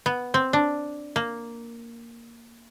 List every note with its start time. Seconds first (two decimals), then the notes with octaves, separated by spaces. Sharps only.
0.06 B3
0.34 C4
0.53 D4
1.16 A#3